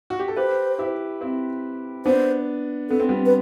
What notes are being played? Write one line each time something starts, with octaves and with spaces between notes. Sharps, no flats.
F#4
G4
A4
G4 B4 C5
E4 G4
C4 E4
B3 D4 C5
B3 A4
C4
G3 B3
B4